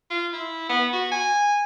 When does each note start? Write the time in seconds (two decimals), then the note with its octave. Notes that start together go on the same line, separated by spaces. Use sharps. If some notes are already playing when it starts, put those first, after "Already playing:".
0.10 F4
0.33 E4
0.69 B3
0.93 F#4
1.12 G#5